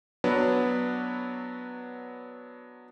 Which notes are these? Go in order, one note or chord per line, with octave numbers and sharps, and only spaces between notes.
F#3 B3 D4 B4